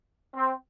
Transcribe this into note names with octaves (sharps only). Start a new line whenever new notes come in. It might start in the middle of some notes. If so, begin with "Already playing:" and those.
C4